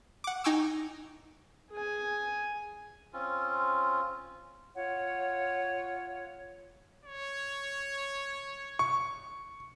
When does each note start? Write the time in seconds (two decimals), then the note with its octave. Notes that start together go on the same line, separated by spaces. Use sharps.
0.24 F#5 D6
0.44 D#4 G5 G#5 C#6 D6 E6
1.71 G#4 G#5
3.13 C4 C#4 F4
4.75 F4 C#5 F#5
7.04 C#5
8.79 C#6